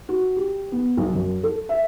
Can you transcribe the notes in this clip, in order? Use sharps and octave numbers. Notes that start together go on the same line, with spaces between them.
F#4
G4
B3
B1
F#2
A4
E5